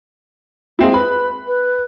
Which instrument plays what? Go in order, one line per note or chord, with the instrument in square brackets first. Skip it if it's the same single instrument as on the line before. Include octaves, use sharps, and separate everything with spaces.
[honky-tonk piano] G#3 C4 E4 [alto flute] A#3
[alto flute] B4 [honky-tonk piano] B5
[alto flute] B4